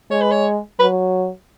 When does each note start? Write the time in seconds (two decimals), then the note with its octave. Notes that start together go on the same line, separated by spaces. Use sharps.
0.10 G#3 C#5
0.21 B4
0.31 C#5
0.79 F#3 B4